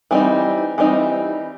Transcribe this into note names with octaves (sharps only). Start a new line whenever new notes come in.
E3 G3 C4 D#4
E3 G3 C4 D#4